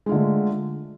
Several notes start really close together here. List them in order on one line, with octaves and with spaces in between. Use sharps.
G#3 F4 D3 A3